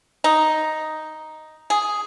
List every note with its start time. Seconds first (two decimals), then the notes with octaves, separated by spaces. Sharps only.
0.24 D#4
1.70 G#4